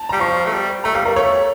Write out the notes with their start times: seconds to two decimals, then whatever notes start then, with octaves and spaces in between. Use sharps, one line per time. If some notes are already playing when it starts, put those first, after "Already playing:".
Already playing: A5
0.09 G3 A#5
0.20 F3 C#6
0.46 A3
0.53 G3
0.84 A3 A#5
0.95 G3 F5
1.05 G3 A#4
1.16 A3 C#5